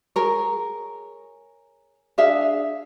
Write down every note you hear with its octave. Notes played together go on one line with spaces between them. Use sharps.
G#4 A#4 C#5
D4 G#4 E5 F5